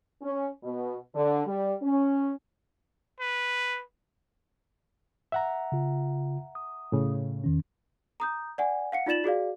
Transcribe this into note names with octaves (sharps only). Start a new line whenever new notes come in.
C#4
B2
D3
G3
C#4
B4
E5 F#5 A#5
C#3 F4
D#6
A2 C#3
E2 D#3 C#4
A#5 D#6 G6
D5 F#5 G#5
F5 F#5 C#7
D#4 F4 D5 A6 E7 F#7
F#4 G#4 D5 F5